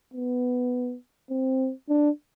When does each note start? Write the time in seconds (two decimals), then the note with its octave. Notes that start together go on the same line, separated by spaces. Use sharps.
0.13 B3
1.30 C4
1.89 D4